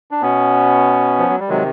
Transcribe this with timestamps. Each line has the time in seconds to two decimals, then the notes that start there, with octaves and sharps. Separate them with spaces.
0.11 D4
0.22 B2 B3 C#4
1.18 F3
1.29 F#3
1.40 G3
1.49 C3 D#3 F#3 G#3